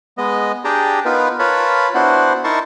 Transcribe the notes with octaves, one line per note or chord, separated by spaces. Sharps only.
G#3 B3 D#5
D4 G4 G#4 G5 A5 A#5
B3 D#4 F4 A#4 B4
F4 A#4 B4 C#5 A5 B5
B3 D4 E4 F#4 C5 F#5
D#4 E4 A#4 A5 C6 C#6